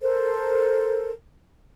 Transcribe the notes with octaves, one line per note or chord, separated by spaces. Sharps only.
A4 A#4 C5